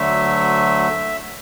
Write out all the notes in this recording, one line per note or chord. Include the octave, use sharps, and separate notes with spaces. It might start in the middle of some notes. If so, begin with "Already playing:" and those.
Already playing: D2 D3 F#3 A3 E5